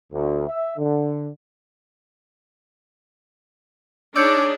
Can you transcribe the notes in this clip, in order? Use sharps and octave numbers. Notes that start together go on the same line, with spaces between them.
D2
E5
D3
D4 D#4 G#4 C#5 D5 E6 G6 C#7